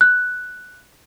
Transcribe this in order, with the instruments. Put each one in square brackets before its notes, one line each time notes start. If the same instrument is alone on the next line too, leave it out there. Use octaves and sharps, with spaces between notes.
[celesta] F#6